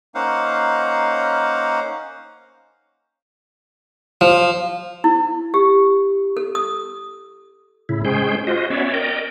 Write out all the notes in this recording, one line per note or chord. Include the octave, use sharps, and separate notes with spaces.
A#3 C#4 D#4 C5 F5 F#5
F3
E4
G4
A4
D#6
A2 C#3 E4
G#3 C#4 G#4 C5 G5
F4 F#4 C5 D#5
B3 C#4 C#5 D5 E5
A#4 D5 D#5 G5